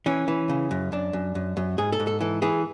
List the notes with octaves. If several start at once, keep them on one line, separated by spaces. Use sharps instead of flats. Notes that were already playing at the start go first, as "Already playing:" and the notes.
E3 C#4
E3
C#3
F#2
F#2 D4
F#2
F#2
F#2
G#2 G#4
A4
G#2
A4
E3 A4
E3 G#4